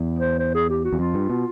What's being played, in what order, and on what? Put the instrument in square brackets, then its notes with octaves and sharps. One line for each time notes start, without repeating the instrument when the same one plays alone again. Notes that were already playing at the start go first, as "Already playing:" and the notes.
Already playing: [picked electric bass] E2
[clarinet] C5
C5
G#4
G4
F#4
[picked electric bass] E2
[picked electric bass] F2 [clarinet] F4
[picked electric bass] G2
B2